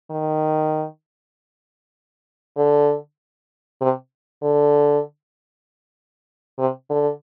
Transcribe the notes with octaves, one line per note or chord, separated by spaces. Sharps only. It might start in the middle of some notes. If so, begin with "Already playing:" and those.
D#3
D3
C3
D3
C3
D3